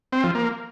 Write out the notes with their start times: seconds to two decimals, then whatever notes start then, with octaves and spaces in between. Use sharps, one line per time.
0.13 C4
0.24 F3
0.35 A#3